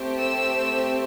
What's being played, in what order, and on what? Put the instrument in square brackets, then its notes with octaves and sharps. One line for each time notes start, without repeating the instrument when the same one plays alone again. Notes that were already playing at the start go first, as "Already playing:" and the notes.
Already playing: [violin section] A3 C4 G4
E6